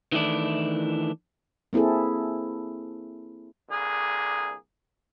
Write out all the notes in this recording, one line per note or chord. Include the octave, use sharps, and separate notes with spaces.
D#3 E3 A3 D4 E4
A#3 C4 E4 G#4 A4
C2 D3 A#3 G#4